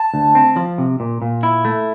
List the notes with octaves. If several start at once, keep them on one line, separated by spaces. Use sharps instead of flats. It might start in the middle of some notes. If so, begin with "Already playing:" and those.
Already playing: A5
D2
C4
F3
C3
A#2
A#2
E4
A3